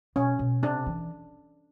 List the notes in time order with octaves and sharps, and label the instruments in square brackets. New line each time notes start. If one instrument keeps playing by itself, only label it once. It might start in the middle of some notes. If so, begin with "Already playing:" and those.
[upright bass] B2 [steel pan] C#4
[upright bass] B2
[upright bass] C3 [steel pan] D4
[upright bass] E3